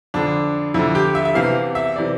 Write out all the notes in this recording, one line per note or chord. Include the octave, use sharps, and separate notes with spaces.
F2 D3 D4
F2 D3 E4
G4
E5
E5
E2 C3 E3 F5
E5
C3 E3 D5